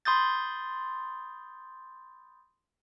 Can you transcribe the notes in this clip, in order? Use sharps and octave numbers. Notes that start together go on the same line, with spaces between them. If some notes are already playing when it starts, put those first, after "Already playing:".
B5 C6 D#6 G6 A6